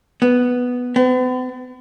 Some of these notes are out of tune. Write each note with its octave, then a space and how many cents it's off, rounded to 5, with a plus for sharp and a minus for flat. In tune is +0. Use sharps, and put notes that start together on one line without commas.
B3 +0
B3 +45